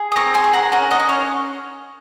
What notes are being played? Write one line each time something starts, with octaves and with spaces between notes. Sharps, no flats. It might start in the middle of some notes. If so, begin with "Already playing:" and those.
Already playing: G#4
D#6
C4 A#5 C#6
G#5 C6
G#4
F#5 A#5
C#4 F#5 A#5
D#5 F#5
C#4
C#5 F5